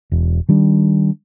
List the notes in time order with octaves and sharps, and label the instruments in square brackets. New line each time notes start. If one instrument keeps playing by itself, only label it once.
[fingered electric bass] E1
D#3 G3 D4